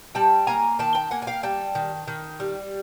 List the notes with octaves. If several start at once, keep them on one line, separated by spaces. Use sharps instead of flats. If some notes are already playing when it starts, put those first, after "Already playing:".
G3 G5 A5
A#3 G#5 A#5
D#3 G5 A5
G5 A5
A#3 F#5 G#5
G#5
F5 G5
G3 G5 A5
D#3
D#3
G3